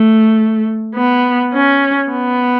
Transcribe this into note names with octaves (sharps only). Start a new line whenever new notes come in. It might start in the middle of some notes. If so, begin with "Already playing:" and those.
Already playing: A3
B3
C#4
B3